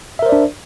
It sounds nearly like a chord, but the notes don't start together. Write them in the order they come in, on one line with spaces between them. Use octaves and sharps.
E5 A#4 C5 D5 D4